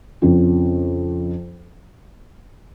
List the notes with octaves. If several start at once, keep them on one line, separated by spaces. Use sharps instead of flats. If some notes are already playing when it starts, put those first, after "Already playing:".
F2 C#3 F3 C4